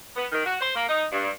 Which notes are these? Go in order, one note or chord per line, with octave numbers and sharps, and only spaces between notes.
B3
D#3
F#4
C5
A#3
D#4
G2